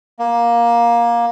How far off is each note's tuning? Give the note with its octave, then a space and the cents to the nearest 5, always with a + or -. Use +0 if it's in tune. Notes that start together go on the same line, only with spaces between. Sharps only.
A#3 +15